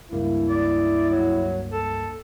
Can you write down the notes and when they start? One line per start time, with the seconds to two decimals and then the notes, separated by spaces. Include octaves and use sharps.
0.12 C#2 G2 A#3 E4
0.49 D5
1.10 F#3
1.72 A4